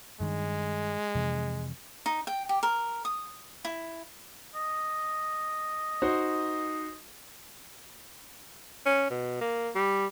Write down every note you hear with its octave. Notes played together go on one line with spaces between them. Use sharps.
G2 D#3 G#3
F2 C3 E3
D#4
G5
G4
A#4
D#6
E4
D#5
D#4 F#4 C5
C#4
B2
A#3
G3